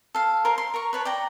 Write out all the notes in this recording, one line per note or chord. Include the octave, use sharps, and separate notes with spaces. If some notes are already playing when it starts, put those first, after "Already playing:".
A4 F5
A#4 C5 F5
C6
A#4 A#5 C#6
B4 C#5 A5
D5 G5 A#5